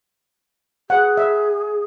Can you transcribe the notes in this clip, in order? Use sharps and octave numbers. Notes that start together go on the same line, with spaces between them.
G#4 F#5
E5